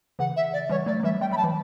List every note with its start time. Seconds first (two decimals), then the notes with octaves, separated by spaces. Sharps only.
0.19 C#3 E3 F#5
0.36 E5
0.53 D5
0.69 E3 G3 C#5
0.86 F#3 A3 D5
1.00 F#3
1.03 E3 G3 E5
1.21 G3 G5
1.31 F#3 B5
1.37 A5
1.44 E3